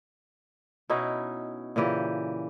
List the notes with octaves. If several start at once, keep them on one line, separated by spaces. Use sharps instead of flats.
B2 C#4 D#4 E4
A#2 C#3 E3 G4